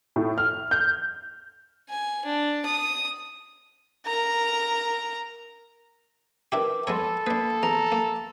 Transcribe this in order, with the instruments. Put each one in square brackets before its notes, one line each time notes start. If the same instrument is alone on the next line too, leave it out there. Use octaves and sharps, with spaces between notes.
[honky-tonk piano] A2
F6
G6
[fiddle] G#5
D4
D#6
[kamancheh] A#4 A#5
[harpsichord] D4 E4 G4 [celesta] A#4 B4 D6
[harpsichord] G#3 B3 C#5 [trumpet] A4 [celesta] B5 C6
[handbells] A#3 [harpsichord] D4 B4
[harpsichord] E2 [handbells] A#5
[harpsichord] A#3